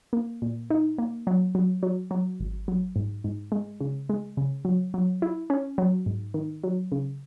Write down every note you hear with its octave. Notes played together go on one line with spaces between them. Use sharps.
A#3
A#2
D#4
A#3
F#3
F#3
F#3
F#3
G#1
F#3
G#2
G#2
G#3
C#3
G#3
C#3
F#3
F#3
E4
C#4
F#3
G#2
D#3
F#3
C#3